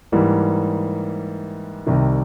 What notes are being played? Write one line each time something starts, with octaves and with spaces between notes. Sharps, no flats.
G#2 E3 G3 A#3
C2 C3 D#3